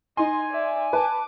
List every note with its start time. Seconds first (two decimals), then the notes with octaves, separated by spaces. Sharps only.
0.17 D#4 D#5 G#5 C6
0.51 D5 E5
0.93 B4 A5 D6